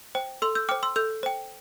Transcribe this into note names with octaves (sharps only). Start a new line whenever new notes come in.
C5 G5
A4 C6 E6
E6 G6
C5 G5 D6 F6
C6 E6
A4 E6 G6
C5 G5